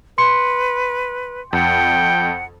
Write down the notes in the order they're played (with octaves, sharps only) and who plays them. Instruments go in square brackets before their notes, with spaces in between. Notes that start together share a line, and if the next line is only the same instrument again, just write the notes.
[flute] B4 [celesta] C6 C#7
[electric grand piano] F2 [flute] F#5 [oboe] G5